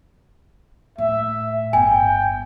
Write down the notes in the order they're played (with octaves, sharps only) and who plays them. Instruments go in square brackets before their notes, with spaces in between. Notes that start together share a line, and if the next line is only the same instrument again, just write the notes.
[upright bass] A2 [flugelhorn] E5
[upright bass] G1 [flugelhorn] G5 [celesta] G#5